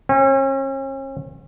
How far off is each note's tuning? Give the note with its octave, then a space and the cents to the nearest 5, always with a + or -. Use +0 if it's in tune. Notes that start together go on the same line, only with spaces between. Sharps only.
C#4 -40